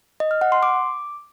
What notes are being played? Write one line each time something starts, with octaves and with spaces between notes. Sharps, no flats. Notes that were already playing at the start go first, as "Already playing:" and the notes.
D#5
F6
F#5
C6
D6